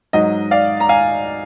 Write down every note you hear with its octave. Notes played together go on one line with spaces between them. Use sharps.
G#2 F#3 D#5
D5 F5
A#5
F5 G#5